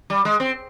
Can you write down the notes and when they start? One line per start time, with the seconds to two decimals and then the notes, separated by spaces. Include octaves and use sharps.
0.10 G3
0.25 G#3
0.40 C4